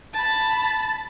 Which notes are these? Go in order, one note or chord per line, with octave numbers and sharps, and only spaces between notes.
A5 B5